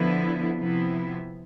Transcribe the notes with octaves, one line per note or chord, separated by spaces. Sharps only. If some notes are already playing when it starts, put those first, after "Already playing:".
Already playing: D3 F3 B3 E4
C3 F3 B3 E4